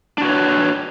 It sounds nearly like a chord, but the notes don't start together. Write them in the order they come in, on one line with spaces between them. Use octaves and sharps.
D4 F#4 B4 C#5